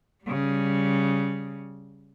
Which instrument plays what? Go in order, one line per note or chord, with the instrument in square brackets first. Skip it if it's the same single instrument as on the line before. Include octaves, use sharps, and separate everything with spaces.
[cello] C#3 G3